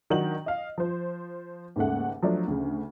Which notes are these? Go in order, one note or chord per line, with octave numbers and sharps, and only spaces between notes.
D#3 F#3 D4 D#4 F#4 F#7
D#5 F5
F3 C5
D#2 G#2 C#3 A3 F#5
F3 F#3 A3 D4
D2 C#3